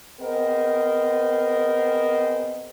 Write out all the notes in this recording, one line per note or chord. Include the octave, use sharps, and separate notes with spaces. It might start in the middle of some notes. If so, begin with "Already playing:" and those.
B3 C4 G#4 A#4 C5 D#5